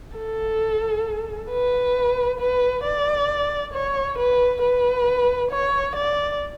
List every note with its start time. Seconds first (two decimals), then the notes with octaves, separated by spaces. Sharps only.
0.17 A4
1.51 B4
2.40 B4
2.84 D5
3.74 C#5
4.18 B4
4.62 B4
5.51 C#5
5.96 D5